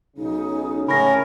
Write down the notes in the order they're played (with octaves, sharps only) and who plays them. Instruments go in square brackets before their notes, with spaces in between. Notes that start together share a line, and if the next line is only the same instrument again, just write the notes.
[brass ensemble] B1 C#3 C#4 [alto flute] D#4
[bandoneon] A2 C#4 A#4 [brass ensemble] C#3 E3 G#3 [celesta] B5 A#6